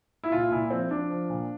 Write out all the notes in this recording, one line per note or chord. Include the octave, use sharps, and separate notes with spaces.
E4
A#2 F4
A#2 E4
F3 C4
F3 D4
F3
A#2